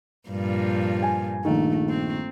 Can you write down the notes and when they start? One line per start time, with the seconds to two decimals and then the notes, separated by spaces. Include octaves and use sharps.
0.29 G2 A#2 F3
1.03 G#5
1.45 A#1 D#3 A3
1.89 C4